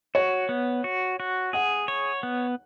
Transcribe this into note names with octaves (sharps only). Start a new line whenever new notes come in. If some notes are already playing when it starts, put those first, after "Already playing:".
F#4 C#5
B3
F#4
F#4
G#4 F#5
C#5
B3